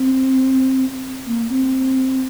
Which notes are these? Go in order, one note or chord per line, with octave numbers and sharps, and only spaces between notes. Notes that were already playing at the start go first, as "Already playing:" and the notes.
Already playing: C4
A#3
C4